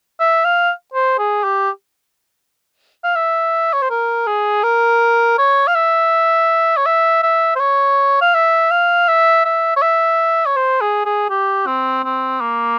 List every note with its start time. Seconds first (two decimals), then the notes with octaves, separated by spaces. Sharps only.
0.20 E5
0.45 F5
0.94 C5
1.19 G#4
1.44 G4
3.04 F5
3.16 E5
3.73 C#5
3.82 C5
3.90 A#4
4.27 G#4
4.63 A#4
5.38 C#5
5.67 F5
5.75 E5
6.77 C#5
6.86 E5
7.23 E5
7.55 C5
7.60 C#5
8.21 F5
8.34 E5
8.71 F5
9.08 E5
9.45 E5
9.76 C#5
9.82 E5
10.46 C#5
10.56 C5
10.81 G#4
11.05 G#4
11.30 G4
11.66 C4
12.04 C4
12.41 A#3